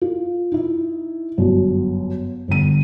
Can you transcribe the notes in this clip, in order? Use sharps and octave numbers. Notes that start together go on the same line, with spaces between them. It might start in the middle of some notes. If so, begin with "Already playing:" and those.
F4
D#4 E4
G1 F#2
G1 D3 D#7